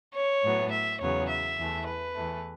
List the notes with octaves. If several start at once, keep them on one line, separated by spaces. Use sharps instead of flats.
C#5
A2 F#3 B3
E5
E2 C#3 F#3 B3 C#5
E5
E2 E3 A3
B4
E2 E3 A3